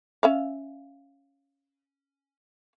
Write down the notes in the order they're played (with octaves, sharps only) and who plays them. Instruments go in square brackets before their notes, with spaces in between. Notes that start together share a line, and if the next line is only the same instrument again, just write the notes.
[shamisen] C#4 E5 F5